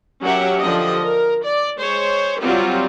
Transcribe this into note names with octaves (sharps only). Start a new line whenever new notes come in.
F#3 C#4 G4 A#4 E5 F#5
D3 F3 G4 D#5
A#4
D5
G#3 C5 C#5
F#3 G3 C4 F4 G4